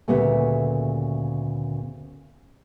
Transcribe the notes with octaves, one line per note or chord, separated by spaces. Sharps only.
D2 A#2 C#3 B3 G4 E5